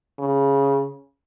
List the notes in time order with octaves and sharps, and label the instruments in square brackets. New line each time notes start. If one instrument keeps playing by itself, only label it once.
[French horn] C#3